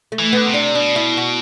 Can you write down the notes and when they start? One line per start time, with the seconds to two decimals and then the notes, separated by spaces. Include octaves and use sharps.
0.12 A3
0.19 E3
0.33 D3 B3
0.46 C3
0.54 D4
0.75 B2 D4
0.96 E4
1.17 F#4